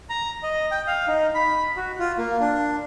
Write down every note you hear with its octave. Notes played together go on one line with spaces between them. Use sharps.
A#5
D#5
G5
F5
D#4
B5
F#4
F4
A#3
D4